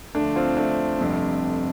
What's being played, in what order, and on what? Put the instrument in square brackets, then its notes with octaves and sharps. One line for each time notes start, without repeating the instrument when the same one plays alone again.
[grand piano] D2 D3 F3 A3 D4
C4 F4
A3 D4
G1 F2 C3